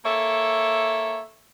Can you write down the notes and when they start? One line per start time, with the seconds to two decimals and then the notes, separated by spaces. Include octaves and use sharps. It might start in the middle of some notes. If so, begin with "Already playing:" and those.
0.05 A#3 A4 C#5 E5